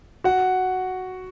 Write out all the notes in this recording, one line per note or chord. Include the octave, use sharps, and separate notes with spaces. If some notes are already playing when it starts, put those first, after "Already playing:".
F#4 F#5